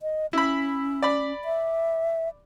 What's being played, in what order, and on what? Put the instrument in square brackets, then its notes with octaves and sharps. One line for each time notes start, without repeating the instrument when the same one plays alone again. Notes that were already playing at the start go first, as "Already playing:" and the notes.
[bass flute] D#5
[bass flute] C#4 [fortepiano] E4 B5
[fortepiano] D5 B5
[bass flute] E5